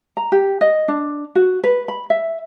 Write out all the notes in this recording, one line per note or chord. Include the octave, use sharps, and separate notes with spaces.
A#5
G4
D#5
D4
F#4
B4
B5
E5